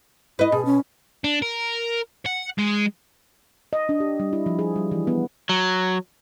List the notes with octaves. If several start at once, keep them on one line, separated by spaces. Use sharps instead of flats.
E4 B4 D#5
B2 G#4
C#4
D4
A#4
F#5
G#3
D#5
D4
G4
G3
E4
F3
G#4
G3
E3
B3
F#3